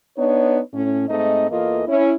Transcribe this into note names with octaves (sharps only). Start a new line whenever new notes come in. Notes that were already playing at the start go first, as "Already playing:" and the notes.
B3 D4 D#4 C#5
A2 C#4
G#2 A3 C4 D#4 D#5
E2 E3 A#3 F4 A4 D#5
C#4 E4